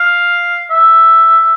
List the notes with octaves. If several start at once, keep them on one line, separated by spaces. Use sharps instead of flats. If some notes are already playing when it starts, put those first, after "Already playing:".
Already playing: F5
E5